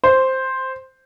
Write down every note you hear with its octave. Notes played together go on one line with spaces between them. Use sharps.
C5